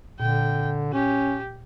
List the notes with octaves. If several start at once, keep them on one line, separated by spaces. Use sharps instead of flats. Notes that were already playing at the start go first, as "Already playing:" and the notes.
A#2 D3 G5
C#4 G4